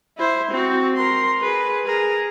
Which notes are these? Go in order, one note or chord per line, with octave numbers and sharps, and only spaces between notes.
E4 C5
C4 F#4
A#4 C6
G#4 B4
G#4 A#4